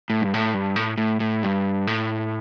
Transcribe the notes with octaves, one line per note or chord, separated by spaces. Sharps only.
A2
G2
A2
G2
A2
A2
A2
G2
A2